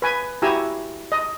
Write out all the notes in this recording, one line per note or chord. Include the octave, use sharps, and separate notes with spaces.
B4 G#5
E4 F#4 G4 G#5 A#5 E6
D#5